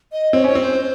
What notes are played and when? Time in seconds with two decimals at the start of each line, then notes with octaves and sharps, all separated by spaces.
0.12 D#5
0.33 C4 C#5
0.44 C#4 C#5
0.55 C4
0.61 C5